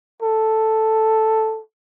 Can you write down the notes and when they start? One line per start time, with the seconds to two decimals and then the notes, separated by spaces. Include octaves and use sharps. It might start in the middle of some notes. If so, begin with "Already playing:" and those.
0.22 A4